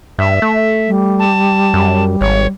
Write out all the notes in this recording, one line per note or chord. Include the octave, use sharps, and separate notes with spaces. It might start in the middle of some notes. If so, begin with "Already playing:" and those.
G2 E5
A3
G3
A5
F#2
G#1 C#5